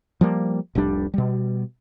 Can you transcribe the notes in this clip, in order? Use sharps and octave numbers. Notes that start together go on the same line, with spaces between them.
F3 G3 A#3
F1 C2 G3 D4
B2 G3